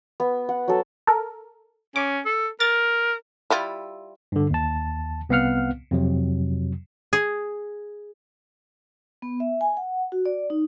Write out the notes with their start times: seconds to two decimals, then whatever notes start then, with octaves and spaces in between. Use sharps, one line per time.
0.20 B3
0.49 F#5
0.68 F#3 A4
1.07 A4 A#4
1.96 C#4 D6
2.25 A4
2.60 A#4 A6
3.50 G3 E4 F4
4.32 G2 D3
4.50 D#2 A5
5.29 C2 B3 C4 F5 F#5 F6
5.91 F2 C3 F#3
7.13 G#4
9.22 B3
9.40 E5
9.61 G#5
9.77 F#5
10.12 F#4
10.26 D5
10.50 D#4